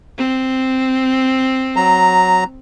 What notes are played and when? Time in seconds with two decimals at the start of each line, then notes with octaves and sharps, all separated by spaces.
0.18 C4
1.76 F#3 A#5